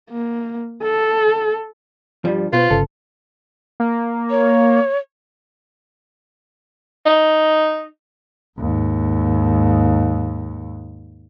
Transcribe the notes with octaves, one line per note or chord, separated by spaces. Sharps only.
A#3
A4
G2 F3 G3
B2 F4 B4 C5
G1 C#3 A4
A#3
C#5
D#4
D#2 G#2